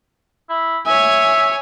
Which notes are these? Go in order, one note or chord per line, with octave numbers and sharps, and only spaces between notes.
E4
C#5 E5 G#5